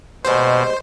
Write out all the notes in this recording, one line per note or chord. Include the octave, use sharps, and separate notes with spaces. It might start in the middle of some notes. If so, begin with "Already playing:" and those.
D#2 B2 G3 G#3 C5